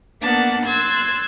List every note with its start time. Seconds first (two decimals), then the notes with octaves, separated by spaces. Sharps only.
0.21 A#3 B3 D4 A#4 F#5 A5
0.66 C6 E6 F#6 G#6 A6